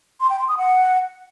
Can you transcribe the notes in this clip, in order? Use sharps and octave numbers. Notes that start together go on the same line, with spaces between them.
C6
G5
C6
D#6
F#5